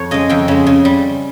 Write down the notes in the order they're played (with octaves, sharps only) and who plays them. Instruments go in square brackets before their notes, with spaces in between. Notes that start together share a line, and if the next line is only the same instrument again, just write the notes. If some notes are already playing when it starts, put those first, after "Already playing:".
Already playing: [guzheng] F2 C#5
C#3 G#3 D#5
F2 G5
C#3 G#3
C#3
G3